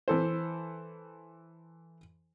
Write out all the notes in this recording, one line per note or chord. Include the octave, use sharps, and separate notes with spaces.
E3 A4 C5